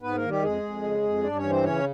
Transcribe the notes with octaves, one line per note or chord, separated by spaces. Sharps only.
G#2 B3 B4
A#3 A#4
D#3
G3 G4
F2 G#3 G#4
F2
C#3
F2
G2 D4 D5
C#4 C#5
E3
C4 C5
C#3 C#4 C#5